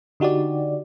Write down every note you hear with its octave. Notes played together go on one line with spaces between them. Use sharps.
D3 D#4 F#4 G4 D5